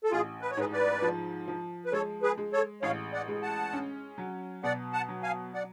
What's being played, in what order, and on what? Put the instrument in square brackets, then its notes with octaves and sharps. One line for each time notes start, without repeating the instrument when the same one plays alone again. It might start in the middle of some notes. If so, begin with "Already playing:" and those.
[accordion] A4
[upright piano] A1 [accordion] F4 G#4
[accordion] B4
C#5
[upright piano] G#2 [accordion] G#4 B4
[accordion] B4 D5
[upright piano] F3
F3
[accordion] B4
[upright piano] G#3 [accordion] A4 C#5
[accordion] G#4 B4
[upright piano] G#3
[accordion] A4 C#5
[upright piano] A1 [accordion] C#5 F5
[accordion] D5 F#5
[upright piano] G#3
[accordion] F#5 A5
[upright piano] C#4
F#3
[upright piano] B2 [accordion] D5 F#5
[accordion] F#5 A5
[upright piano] F#3
[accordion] F5 G#5
D5 F#5